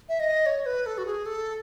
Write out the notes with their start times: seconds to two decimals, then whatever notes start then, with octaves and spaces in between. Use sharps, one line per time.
0.09 E5
0.20 D#5
0.46 C#5
0.66 B4
0.86 A4
0.98 F#4
1.06 G#4
1.26 A4